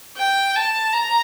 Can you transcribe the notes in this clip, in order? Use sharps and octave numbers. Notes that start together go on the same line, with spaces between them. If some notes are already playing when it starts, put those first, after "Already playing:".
G5
A5
A#5